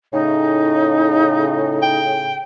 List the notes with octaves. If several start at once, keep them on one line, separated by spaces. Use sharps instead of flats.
A2 C#3 D#4
G5